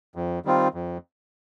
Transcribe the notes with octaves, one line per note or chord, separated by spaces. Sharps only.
F2
D#3 G3 C4 F4
F2